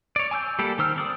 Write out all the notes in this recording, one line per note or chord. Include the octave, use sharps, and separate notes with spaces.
C#5 D5
G#5 D6 E6 G6
G3 A#3 G4 A4
D#3 C5 E6 F6
C4 D5 D#6